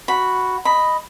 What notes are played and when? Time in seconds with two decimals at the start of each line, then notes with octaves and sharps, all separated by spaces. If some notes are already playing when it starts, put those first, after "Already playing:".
0.08 F#4 B5
0.65 D#5 B5